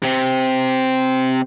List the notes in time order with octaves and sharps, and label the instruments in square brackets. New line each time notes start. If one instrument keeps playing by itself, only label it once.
[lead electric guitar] C3 C4